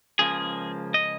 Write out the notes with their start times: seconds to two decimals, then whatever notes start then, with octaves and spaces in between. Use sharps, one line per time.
0.19 C#2 C#3 F3 A#3 G#4
0.94 D#5